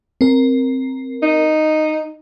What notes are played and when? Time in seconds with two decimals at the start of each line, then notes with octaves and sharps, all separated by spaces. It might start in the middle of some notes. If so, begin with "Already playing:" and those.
0.21 C4 A#4
1.22 D#4